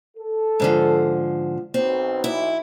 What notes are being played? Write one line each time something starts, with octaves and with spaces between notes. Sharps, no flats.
A4
G#2 D3 F3
B1 C4
E4